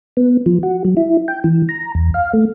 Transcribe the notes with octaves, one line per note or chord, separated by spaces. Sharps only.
B3
F3
F#4
F#3
E4
G5
E3
A#5
E2
F5
A3